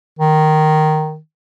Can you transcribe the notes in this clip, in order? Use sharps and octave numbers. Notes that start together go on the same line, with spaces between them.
D#3